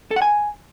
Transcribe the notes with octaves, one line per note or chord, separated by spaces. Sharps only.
A4
F#5
G#5